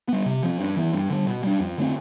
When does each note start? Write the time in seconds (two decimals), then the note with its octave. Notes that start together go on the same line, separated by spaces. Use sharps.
0.09 G3 B3
0.26 C3
0.43 F3 C4
0.60 G2
0.77 E3 B3
0.94 G2
1.10 D3 G3
1.27 B2
1.43 G3 D4
1.60 F2
1.78 D3 A3 C4